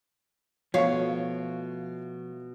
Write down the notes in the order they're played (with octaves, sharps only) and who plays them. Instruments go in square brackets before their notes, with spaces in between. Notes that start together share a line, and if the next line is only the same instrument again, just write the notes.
[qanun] B2 [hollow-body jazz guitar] F3 A3 [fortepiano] C#5 C#6 [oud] F5